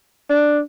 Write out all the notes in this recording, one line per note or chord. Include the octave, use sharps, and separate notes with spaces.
D4